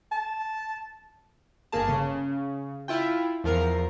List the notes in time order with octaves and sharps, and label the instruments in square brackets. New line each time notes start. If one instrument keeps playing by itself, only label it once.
[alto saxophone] A5
[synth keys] G1 A#3 G#4 A5
C#3
E4 F4 G5
E2 F3 A#4 A#5 C7